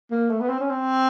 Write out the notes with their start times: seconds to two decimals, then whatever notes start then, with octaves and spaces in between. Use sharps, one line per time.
0.11 A#3
0.30 A3
0.40 B3
0.49 C4
0.60 C#4
0.70 C4